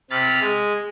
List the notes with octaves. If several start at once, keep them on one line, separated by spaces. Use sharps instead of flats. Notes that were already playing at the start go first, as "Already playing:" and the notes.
C3 B5 F6 A6
G#3